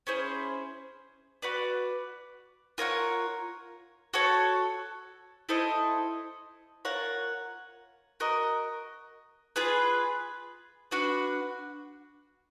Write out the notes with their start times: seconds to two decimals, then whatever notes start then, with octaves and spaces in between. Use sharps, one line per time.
0.07 C#4 E4 G#4 C5
1.42 F#4 B4 D5
2.78 F4 A#4 C#5 F#5
4.13 F#4 A4 C#5
5.49 E4 A4 C5 D#5
6.85 F4 A#4 C#5 F#5
8.20 F#4 A#4 D#5
9.56 F4 G#4 B4
10.91 D4 F#4 B4